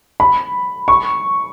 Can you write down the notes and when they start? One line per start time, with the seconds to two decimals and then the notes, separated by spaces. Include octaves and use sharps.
0.20 B5
0.88 C#6